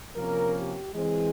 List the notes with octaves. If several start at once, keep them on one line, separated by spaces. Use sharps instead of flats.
C3 F3 A#3 C#4 A#4
G4
E3 G#3 C4 G#4